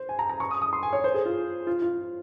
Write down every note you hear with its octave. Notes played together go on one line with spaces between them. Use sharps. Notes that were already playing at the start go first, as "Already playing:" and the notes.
Already playing: C5
G#5
A#5
A#5
C#6
D#6
D#6
C6
G#5
C#5
C5
G#4
F4
F4
F4